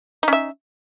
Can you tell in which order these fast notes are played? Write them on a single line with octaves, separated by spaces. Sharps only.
D#4 C#4 E5